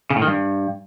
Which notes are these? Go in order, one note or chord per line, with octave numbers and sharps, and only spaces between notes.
C#3
A2
D#3
G2